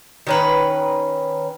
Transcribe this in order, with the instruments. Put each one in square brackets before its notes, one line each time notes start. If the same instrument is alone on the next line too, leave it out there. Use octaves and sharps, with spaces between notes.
[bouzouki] D#3 C#4 B4